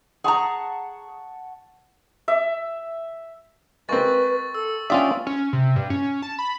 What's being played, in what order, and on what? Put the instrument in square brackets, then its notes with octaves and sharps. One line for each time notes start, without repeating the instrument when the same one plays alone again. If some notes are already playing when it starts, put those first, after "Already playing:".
[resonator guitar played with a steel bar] G#4 A#5 [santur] F#5 A5 C#6
[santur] E5
[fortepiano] G#3 A#3 C4 [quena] B4 [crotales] C#6 A6
[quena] A4 [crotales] E6
[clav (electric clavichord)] C#4 F4 E5 [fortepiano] D4 [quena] G5 [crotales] D#6
[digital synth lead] C#4
C3
G2
C#4
A5
B5